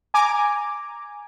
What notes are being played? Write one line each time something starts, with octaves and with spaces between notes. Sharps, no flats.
G#5 A#5 D6